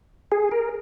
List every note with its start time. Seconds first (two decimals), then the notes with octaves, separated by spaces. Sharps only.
0.32 G#4
0.51 A#4